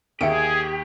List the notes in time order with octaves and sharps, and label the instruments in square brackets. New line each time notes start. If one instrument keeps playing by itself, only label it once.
[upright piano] D#2 [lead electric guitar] G4 [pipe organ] G#4 [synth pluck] E5 C#7 D7